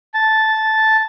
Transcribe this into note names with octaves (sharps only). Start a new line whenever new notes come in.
A5